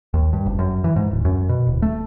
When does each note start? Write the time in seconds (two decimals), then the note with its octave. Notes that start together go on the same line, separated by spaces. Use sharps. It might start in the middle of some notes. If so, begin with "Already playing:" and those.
0.14 D#2
0.33 G2
0.46 F#1
0.59 F#2
0.84 E3
0.96 G#2
1.11 D1
1.25 F#2
1.49 B2
1.67 D1
1.82 A3